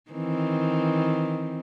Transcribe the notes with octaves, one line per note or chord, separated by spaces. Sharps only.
D#3 E3 C4